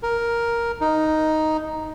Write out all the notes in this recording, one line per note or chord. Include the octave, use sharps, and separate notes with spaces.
A#4
D#4